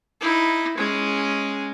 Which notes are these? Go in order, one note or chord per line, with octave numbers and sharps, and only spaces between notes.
D#4 E4
G#3 C#4